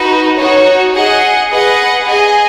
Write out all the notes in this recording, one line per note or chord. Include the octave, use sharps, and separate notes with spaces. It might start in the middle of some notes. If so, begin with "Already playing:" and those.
Already playing: D#4 F#4 B4
D#4 F#4 C#5
G#4 D#5 F#5
G#4 B4 D#5 F#5
G#4 D#5 G#5